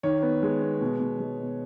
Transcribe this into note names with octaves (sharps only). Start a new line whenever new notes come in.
D#3 C#5
B3
G#3
B3
B2
B2
G#3
B2